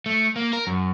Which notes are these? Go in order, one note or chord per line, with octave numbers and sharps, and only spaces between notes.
A3
A#3
A#4
F#2